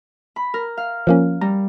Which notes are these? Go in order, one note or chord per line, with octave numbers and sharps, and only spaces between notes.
B5
A#4
F5
F3 A#3 C#4
G3 A#5